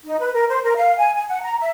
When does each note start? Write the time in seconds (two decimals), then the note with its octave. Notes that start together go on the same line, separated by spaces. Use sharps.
0.05 D#4
0.20 B4
0.34 A#4
0.49 C5
0.64 A#4
0.76 F5
0.97 G#5
1.14 G#5
1.29 F#5
1.42 A#5
1.60 E5